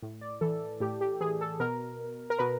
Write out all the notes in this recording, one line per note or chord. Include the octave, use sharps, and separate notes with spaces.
A2
D5
E3 A4
A2 G4
G4
E3 G#4
A4
B2 A#4
A#4
B2 B4